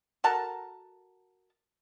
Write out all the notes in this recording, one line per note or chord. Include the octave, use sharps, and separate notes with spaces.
F#4 A4 A#4 A5